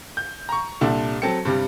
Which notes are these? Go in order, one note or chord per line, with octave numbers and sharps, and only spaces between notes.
G6
A#5 C#6
C2 A#2 G3 D4 A4 E5
F#3 C4 A4 G5 C#7
G2 C3 G3